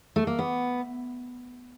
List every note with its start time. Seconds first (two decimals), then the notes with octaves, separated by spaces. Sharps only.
0.16 A3
0.27 A#3
0.39 B3